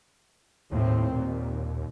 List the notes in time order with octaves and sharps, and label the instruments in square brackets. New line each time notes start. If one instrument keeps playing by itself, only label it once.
[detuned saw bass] D#2 [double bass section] A2 C4
[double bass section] A#2